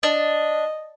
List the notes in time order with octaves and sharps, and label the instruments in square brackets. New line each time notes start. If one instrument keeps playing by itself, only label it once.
[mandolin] D4 [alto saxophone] D#5